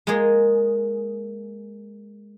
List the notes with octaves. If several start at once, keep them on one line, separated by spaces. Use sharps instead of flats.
G#3 A#3 F4 G#4